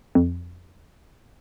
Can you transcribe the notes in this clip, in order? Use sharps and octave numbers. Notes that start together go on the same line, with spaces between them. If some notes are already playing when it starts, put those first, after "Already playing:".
F2